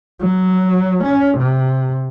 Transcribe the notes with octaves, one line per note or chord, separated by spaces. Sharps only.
F#3
C#4
C3